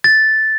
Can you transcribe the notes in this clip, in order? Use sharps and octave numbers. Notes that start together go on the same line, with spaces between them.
A6